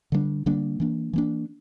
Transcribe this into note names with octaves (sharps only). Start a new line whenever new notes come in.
D3 G3 A#3 D4
D3 G3 A#3 D4
E3 A#3 D4
E3 A#3 D4